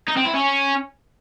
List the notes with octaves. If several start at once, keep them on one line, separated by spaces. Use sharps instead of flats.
D#4
C4
E4
C#4